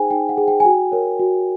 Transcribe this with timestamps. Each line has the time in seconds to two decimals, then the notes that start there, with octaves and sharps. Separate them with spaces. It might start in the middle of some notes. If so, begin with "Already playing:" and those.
Already playing: D#4 G#4 C5 G5 G#5
0.10 D#4 G5
0.29 F#5
0.38 G#4 C5
0.48 G5
0.60 G#5
0.65 F#4 G5
0.92 A#4 C#5
1.19 F#4